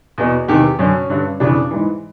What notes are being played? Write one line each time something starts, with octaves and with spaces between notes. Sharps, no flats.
E2 B2
E2 C3 D#3 G4
F#2 D3 C#4
G2 D3
F2 C#3 E3 D4
G#2 E3